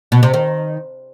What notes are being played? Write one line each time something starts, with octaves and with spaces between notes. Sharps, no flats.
B2
C3
D#3